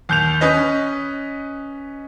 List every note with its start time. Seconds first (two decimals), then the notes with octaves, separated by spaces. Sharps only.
0.09 D#2 G6 F7
0.41 C#4 B4 D#5